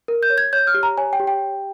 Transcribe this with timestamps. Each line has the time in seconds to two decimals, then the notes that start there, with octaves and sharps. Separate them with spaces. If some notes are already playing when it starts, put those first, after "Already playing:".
0.08 A#4
0.23 G6
0.30 C#5
0.38 G#6
0.53 C#5 G6
0.67 F6
0.74 G4
0.83 A#5
0.98 C#5 G#5
1.13 G5
1.20 G4
1.27 G5